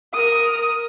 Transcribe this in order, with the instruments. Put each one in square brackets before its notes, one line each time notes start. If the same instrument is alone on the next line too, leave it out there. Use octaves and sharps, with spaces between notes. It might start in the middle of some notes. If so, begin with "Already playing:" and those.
[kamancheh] A#4 D#6